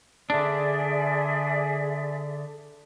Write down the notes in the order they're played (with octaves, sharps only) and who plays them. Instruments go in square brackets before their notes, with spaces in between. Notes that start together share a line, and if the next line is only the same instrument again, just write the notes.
[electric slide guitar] D3 D4 [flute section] G#4 D5 E5